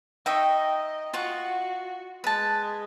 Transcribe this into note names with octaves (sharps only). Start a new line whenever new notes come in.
D#4 D#5 E5 G5 C#6
F4 F#4 F#5 C#6
G#3 B4 A5